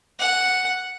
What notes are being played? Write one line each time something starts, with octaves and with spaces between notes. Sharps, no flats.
F#5